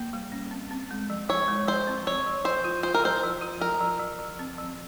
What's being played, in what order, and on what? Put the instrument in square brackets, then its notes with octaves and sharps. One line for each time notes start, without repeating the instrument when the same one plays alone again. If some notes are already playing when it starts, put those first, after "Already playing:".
Already playing: [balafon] A#3
G3
C#4
C4
C4
G#3
F3
[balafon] F3 [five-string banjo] C#5
[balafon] G#3
[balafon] F3 [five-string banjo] C5
[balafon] C4
[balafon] F3 [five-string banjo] C#5
[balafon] F3
[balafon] F3 [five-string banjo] C5
[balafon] F4
[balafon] F4 [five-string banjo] C5
[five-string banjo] A#4
[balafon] F3 [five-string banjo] C5
[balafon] F3
F4
[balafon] F3 [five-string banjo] A#4
[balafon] F3
F3
F3
C4
F3